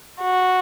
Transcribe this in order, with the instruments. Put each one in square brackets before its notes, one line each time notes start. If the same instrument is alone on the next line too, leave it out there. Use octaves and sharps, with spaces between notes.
[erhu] F#4